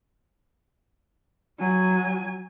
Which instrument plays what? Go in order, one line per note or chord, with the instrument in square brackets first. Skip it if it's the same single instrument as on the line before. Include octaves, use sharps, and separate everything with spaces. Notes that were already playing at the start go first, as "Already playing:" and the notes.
[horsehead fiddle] F#3 G#5